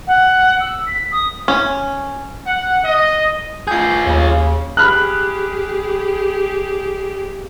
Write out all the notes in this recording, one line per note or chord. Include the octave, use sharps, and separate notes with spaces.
F#5
E6
B6
D#6
C#4
F#5
D#5
F4 G#4 G6 C7
D#2 C#3
G4 G#4 B5 F6 F#6